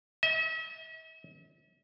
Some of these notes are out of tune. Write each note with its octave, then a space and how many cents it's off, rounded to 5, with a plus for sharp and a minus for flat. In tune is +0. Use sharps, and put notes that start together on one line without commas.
E5 -45